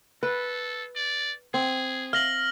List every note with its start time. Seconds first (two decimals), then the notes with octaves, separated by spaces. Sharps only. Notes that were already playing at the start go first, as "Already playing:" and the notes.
0.23 A4 B4
0.96 D5
1.54 C4 G#4
2.13 F5 F6 A#6 F#7